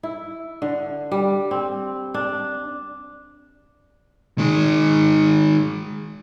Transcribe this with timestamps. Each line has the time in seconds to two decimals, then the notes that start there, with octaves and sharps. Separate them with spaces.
0.03 E4
0.62 D3
1.12 G3
1.51 C4
2.14 D4
4.38 D#3 G#3